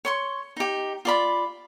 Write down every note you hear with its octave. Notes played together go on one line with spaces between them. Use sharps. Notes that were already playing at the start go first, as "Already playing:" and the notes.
C#5 C6 C#6
D#4 G4
F4 D5 B5